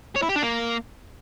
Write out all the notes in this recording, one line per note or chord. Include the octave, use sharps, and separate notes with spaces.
C#5
E4
G4
D4
A#3